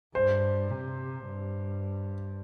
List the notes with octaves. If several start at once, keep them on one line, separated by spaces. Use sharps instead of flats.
G2 C5
C3
G2